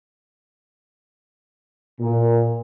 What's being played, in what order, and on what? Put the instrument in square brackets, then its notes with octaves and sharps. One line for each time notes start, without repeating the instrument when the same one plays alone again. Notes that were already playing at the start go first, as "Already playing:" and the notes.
[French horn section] A#2